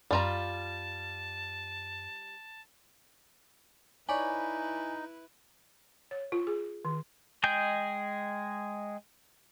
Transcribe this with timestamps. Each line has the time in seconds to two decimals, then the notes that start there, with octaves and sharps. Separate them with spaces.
0.11 F#2 G3 F4 A5 A#5
4.09 D#4 E4 B4 C#5 D5 G#5 B5
6.11 C#5
6.32 F4
6.47 G#4
6.85 D#3
7.44 G#3 G#4 D#5 G5 G6